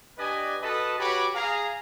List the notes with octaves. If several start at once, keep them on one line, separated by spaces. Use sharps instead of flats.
D4 G4 B4 D5 D#5 G#5
F#4 A4 B4 D#5 A5
F#4 G4 B4 C#5 B5 D6
G#4 F5 A#5